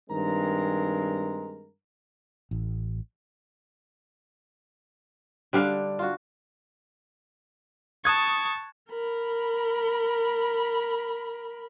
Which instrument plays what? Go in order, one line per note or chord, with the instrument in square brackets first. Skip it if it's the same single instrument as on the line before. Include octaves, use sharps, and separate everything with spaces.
[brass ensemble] G2 D#3 G#3 C4 A#4 A#5
[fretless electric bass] A1
[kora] D3 G3 D4 F5
F4 F#4
[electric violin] A5 C#6 [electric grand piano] D#6 F#6 G#6
[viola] A#4 B5